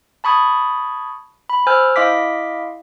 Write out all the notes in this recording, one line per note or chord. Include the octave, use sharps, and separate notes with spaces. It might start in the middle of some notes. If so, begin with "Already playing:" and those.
A5 B5 C#6 D#6 G#6
B5
C5 G#5 E6 F6 G6
E4 D#5 F5 C6 D6 B6